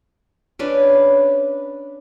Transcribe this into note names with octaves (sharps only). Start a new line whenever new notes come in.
C#4 D4 B4